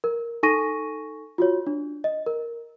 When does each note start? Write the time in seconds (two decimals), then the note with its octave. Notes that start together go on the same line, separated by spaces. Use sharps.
0.04 A#4
0.43 D#4 A4 G#5 C#6 A#6 D#7
1.38 F4 F#4 C#5
1.67 D4
2.04 D#5
2.26 A#4